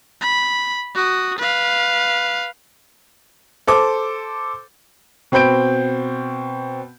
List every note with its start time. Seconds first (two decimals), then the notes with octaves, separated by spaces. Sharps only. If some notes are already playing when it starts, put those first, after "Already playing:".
0.21 B5
0.95 F#4 D#6
1.38 B4 F5
3.67 A4 C5 D6
5.32 B2 C4 B5 G6 D7